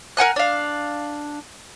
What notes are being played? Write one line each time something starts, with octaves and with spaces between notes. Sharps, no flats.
A#4 F#5 G#5 F#6
D4 F5